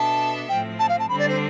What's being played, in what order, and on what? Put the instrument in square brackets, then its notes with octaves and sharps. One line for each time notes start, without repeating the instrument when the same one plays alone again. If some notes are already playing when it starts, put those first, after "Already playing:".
Already playing: [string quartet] B2 B3 D4 A4 E5 [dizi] A5
[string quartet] A2 F3 C4 [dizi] G5
[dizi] A5
F5
A5
[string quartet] D3 G3 C4 [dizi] B5
[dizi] D5
C5